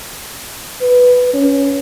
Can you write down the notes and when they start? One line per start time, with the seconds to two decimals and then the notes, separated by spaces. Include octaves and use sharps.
0.81 B4
1.33 C#4